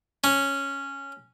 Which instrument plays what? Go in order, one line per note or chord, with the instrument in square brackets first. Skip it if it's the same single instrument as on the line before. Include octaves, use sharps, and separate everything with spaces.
[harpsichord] C#4